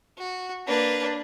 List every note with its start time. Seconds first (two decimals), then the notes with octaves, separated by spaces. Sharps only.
0.18 F#4
0.67 A#3 D4 B4